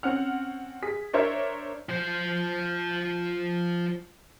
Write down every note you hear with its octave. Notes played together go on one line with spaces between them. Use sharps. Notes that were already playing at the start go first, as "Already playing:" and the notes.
C4 C#4 F#5 F6
G#4 B6
D4 A#4 C5 C#5 E5
F3 C5